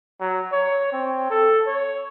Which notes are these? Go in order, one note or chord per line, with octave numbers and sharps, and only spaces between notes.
F#3
C#5
C4
A4
C#5